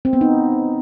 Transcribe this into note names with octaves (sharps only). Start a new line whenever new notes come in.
C4
B3
D#4